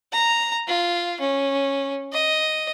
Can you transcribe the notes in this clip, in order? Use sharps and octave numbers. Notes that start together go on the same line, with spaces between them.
A#5
F4
C#4
D#5